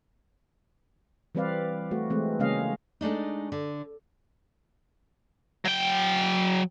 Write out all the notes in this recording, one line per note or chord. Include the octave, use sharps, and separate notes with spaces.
E3 G3 C4 B4 D5 F5
A3 F#4
E3 G#3 A3 C4
C#3 G#3 A#3 C#4 D#5 F5
G#3 A3 D4 D#4
D3
F#3 G5